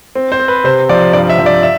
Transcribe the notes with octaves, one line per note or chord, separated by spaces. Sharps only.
C4
C5
C4
B4
C3 C5
F3 D5
G2 D5
E5
F3
D5
E5